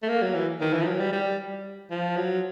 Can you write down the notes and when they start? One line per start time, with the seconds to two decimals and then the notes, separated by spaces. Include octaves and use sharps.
0.03 A3
0.08 A#3
0.22 F#3
0.34 E3
0.61 D#3
0.73 E3
0.82 F3
0.86 F#3
1.00 G3
1.12 G3
1.91 F3
2.16 F#3